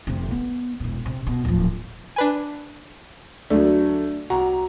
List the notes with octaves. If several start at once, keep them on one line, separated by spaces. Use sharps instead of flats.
F1 C3
B3
E1 B2
C3
B2
D1 F3
D4 B4 G#5
D2 F#3 A3 D4
C2 F#4 A#5